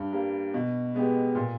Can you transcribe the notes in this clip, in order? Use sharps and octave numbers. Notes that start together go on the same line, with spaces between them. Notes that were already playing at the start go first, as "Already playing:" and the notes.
Already playing: G2
G3 A#3
B2
G#3 B3 G4
A#2